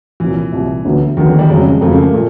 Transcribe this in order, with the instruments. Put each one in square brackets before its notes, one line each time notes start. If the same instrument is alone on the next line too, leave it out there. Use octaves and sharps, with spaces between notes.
[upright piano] C2 A#2 F#3 [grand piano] E3
[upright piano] C2 A#2 F#3
D2 D3 F#3 B3
[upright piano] D2 D3 F#3 B3 [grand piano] D#3
[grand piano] E3
G3
[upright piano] F2 C#3 F#3 [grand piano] G#3
[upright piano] F2 C#3 F#3 [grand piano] A3
[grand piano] A#3
A#3
[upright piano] A#2 [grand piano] A3